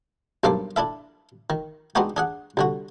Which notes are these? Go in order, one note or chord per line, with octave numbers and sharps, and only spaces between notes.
B1 G2 A#3 A4 C5 D6
D4 E4 A4 E5
D#3
G#3 B3 D4 D#4 F#4 G4
D4 G#4 F#5
C2 D3 F#4